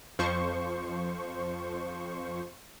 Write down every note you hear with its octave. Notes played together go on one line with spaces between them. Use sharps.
F2 F3 C5 C#6